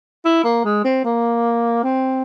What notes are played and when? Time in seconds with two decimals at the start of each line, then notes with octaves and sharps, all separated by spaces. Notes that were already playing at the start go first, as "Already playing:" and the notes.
0.25 E4
0.44 A#3
0.64 G#3
0.84 C4
1.04 A#3
1.83 C4